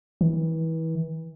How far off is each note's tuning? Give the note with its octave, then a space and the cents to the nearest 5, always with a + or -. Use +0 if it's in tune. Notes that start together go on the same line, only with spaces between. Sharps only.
E3 -30